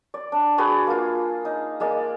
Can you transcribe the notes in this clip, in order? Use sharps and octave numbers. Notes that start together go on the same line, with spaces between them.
D5
D4
F#4 G#4 B4 D5
A#3 F4
D#4
G#3 A#3 D5